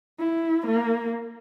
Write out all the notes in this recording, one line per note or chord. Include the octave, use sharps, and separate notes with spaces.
E4
A#3